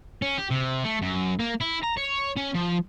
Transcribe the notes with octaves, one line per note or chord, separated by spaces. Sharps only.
C#4
G4
C3
A3
F#2
A#3
E4
A#5
C#5
C#4
F3